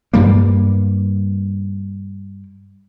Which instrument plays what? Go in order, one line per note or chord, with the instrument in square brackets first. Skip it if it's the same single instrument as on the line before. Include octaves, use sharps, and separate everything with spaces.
[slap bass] G2 G3 A#3